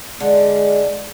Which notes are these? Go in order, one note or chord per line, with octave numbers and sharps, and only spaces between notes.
D3 G#3